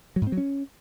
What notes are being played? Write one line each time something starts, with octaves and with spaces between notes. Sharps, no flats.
F#3
G#2
C4
F#3
C#4